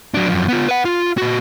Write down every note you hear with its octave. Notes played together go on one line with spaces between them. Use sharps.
F#3 D4
F#2 F3
B3 F4
B4 F#5
F4
A#2 F#4